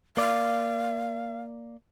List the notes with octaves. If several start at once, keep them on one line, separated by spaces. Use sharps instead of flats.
A#3 D5 F5